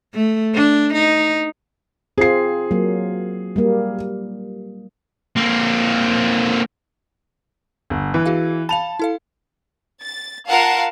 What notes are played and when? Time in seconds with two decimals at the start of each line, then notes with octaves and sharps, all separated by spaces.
0.14 A3
0.55 D4
0.94 D#4
2.18 C4 F4 G#4 C7
2.71 F#3 A#3
3.56 G3 A#3
5.36 A#3 C4
7.90 G1
8.14 E3
8.26 F#4 G#4 F5
8.69 F5 A5 B5 F7
8.99 E4 A4 F5
10.01 A6
10.48 F4 A#4 F5 F#5 A5